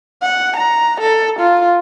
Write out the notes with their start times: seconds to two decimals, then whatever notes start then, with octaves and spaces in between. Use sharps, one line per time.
0.22 F#5
0.57 A#5
1.01 A4
1.39 F4